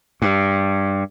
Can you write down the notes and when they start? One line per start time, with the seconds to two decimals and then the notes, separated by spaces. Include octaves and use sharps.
0.22 G2